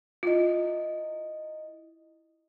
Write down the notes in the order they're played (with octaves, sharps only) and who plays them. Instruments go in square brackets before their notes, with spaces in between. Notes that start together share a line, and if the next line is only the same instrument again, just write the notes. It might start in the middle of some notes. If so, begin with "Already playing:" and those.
[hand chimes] E4 D#5 [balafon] F4